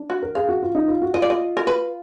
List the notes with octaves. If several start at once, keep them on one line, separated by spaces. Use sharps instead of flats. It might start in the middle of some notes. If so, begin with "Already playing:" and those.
Already playing: D4
F#4
A#4
G#4 F5
F#4
F4
D#4
F4
F#4
F4 D#5
D5
D#5
A#4
B4